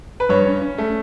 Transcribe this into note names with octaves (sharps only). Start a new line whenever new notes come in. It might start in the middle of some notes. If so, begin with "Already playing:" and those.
B4
G2 C#5
C#4
C#4
A3